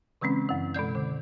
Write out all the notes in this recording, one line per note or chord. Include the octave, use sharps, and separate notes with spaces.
C#3 E3 G#3 C4 C#4
F#2 E3
B2 G#3 D5 G6
D3